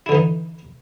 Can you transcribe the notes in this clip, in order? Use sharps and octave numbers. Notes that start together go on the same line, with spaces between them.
D3 E3 D#4 E4